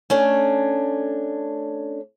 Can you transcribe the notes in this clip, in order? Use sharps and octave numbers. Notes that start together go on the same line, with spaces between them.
A3 C#4 D4